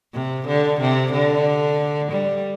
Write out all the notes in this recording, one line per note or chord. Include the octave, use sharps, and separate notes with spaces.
C3
D3
C3
D3
G3